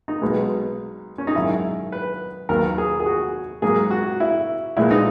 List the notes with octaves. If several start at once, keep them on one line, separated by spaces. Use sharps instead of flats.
D#4
B1 B2 G#3 B3
C#4
D#4
G#1 F#2 D#3 E4
B4
D#2 D#3 F#3 B3 A#4
G#4
G#4
F#4
G#2 F#3 A#3 G#4
F#4
E4
A#1 A#2 G#3 B3 E4
D#4